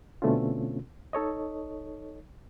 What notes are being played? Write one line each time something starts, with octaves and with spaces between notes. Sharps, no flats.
B2 D3 A3 C4 C#4 F4
D#4 A4 C#5 D#5